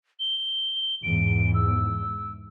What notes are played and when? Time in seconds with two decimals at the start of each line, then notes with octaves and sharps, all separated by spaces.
0.20 G7
1.03 E2 G#2 D7
1.54 E6